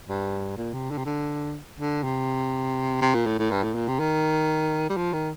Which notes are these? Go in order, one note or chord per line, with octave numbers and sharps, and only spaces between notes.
G2
A#2
C3
D3
C3
D3
D3
C3
C3
A#2
A2
A2
G2
A2
A#2
C3
D#3
G3
F3
D#3